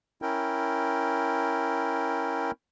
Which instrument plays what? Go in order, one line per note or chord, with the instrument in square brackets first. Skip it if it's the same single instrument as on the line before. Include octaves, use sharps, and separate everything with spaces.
[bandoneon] C#4 E4 A#4 G5